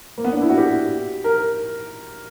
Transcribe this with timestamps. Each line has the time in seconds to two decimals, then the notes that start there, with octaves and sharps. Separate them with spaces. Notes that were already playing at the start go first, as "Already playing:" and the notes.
0.18 A#3
0.24 B3
0.33 D4
0.41 E4
0.49 F#4
0.58 G4
1.24 A#4